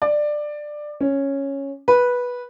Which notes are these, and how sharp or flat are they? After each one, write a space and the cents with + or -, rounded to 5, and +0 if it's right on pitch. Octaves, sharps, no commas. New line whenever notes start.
D5 +15
C#4 -5
B4 -10